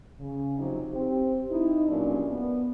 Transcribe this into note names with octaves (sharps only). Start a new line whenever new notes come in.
C#3
C3 F3 F#3 C4 D#4
C4 G4
D#4 E4
G2 A#2 F#3 A3 C#4 D4
B3